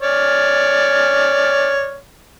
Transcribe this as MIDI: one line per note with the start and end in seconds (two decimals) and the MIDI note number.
0.02 1.97 73
0.02 1.97 74
0.02 1.97 89